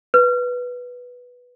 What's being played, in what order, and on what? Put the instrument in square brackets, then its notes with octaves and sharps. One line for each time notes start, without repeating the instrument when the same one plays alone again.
[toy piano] B4